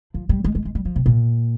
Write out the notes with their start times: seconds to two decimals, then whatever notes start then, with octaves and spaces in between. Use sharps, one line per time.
0.14 F3
0.29 G3
0.44 G#3
0.55 G#3
0.65 G#3
0.75 G3
0.85 F3
0.96 C3
1.06 A#2